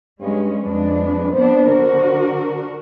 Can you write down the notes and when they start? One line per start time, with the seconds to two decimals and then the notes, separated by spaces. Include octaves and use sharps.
0.20 G2 G#3 C#4
0.63 F2 G#3 D4 B4
1.33 B3 C4 D4 C5
1.71 D3 F#4 A#4